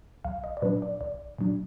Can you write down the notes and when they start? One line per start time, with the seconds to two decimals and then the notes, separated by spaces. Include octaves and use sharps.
0.25 B1 F5
0.44 D#5
0.57 D5
0.62 A#2 F#3 D4 B4
0.82 D5
1.01 B1 D5
1.38 A#2 F#3 D4